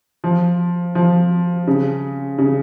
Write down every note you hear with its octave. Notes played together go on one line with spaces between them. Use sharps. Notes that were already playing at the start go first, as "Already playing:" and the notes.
F3
F3
C#3
C#3